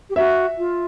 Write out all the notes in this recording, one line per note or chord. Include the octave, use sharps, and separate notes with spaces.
G4
F#4 E5
F4